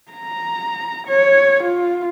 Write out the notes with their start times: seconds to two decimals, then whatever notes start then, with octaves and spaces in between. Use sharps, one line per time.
0.12 A#5
1.07 C#5
1.63 F4